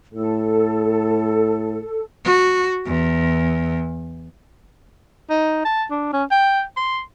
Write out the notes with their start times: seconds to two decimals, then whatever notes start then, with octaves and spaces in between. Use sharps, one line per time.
0.14 A2 A4
2.24 F#4
2.86 E2
5.30 D#4
5.65 A5
5.91 D4
6.13 C#4
6.31 G5
6.77 C6